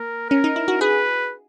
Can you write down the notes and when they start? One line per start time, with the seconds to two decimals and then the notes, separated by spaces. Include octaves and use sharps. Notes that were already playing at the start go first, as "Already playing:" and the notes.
Already playing: A#3 A#4
0.29 C#4 A#4
0.44 D#4
0.56 E4
0.68 F#4
0.81 G#4 B4